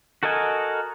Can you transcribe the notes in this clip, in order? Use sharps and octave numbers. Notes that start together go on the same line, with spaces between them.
F#4 A4 A#4 D#5 G#5